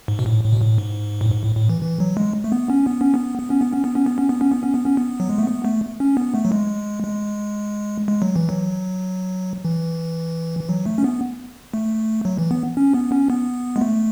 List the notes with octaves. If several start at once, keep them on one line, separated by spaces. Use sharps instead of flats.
G#2
B2
A2
A2
B2
A2
G#2
A2
G#2
A2
A2
E3
E3
F#3
G#3
A3
B3
C#4
B3
C#4
B3
B3
C#4
B3
C#4
B3
C#4
B3
C#4
B3
C#4
B3
C#4
B3
C#4
B3
F#3
G#3
A3
B3
A3
C#4
B3
A3
F#3
G#3
G#3
G#3
F#3
E3
F#3
E3
E3
F#3
A3
C#4
B3
A3
F#3
E3
B3
C#4
B3
C#4
B3
G#3
A3